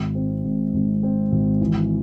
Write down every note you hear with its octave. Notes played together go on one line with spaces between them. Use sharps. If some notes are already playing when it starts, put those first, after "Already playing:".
Already playing: G#1
C4
G#2
G#1
C4
G#1
E3